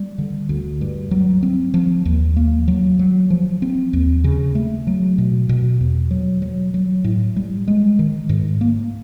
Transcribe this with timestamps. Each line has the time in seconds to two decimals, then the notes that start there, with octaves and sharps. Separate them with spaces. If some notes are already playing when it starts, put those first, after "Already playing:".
Already playing: G3
0.18 D3
0.49 D2
0.81 G2
1.11 F#3
1.43 C4
1.74 F3
2.05 D#2
2.37 A#3
2.68 F#3
2.99 F#3
3.30 F3
3.62 C4
3.93 D#2
4.24 C#3
4.55 A3
4.87 F#3
5.18 B2
5.49 B2
5.81 E2
6.11 F#3
6.42 F#3
6.74 F#3
7.04 A2
7.36 G3
7.68 G#3
7.99 D#3
8.29 G#2
8.61 A#3